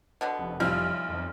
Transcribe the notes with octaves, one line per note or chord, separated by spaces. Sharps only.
B2 D3 B3
F1
B1 F3 G3 E4 F4 F6
F2